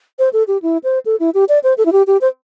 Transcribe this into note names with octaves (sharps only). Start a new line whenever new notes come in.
C5
A4
G4
E4
C5
A4
E4
G4
D5
C5
A4
E4
G4
G4
C5